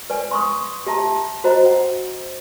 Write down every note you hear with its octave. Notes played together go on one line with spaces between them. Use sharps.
B4 D5 G#5
C6 C#6 D#6
G4 E5 A5 A#5
F#4 C5 D#5 A#5
F#5